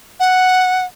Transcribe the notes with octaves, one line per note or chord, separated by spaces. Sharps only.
F#5